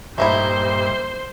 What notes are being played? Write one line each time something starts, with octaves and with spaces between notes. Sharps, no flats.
G2 A#2 A3 D#4 E4 C5